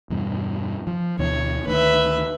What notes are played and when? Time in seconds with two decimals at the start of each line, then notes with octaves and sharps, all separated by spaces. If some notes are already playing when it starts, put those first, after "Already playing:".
0.10 E2 G2 B2
0.87 F3
1.19 D2 B2 E3 C#5
1.67 D2 D#3 B4 E5